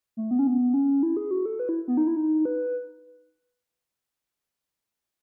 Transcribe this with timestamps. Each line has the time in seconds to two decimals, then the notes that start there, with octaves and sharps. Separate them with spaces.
0.17 A3
0.31 B3
0.39 C#4
0.47 B3
0.74 C#4
1.03 E4
1.17 G#4
1.31 F#4
1.46 A4
1.59 B4
1.69 E4
1.88 B3
1.97 D#4
2.07 E4
2.16 D#4
2.45 B4